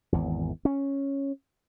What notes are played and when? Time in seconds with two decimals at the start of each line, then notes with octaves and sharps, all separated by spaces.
0.12 G#1 E2
0.65 C#4